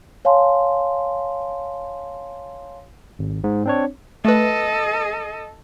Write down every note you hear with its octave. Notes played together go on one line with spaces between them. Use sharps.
C#5 F5 G#5 A5 C6
G#1
G#2
C4 D4 C#5
A3 A4 B4 D#5